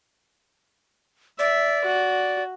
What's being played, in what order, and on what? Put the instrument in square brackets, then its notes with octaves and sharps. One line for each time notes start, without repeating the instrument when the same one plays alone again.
[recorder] D5 [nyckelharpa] E5
[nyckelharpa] F#4